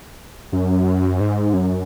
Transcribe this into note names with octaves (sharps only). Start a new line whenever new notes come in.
F#2
G#2
F#2